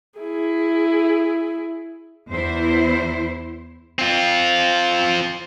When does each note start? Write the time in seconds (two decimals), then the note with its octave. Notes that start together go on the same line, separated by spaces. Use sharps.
0.19 E4 G#4
2.30 E2 E4 C5
3.99 C4 F4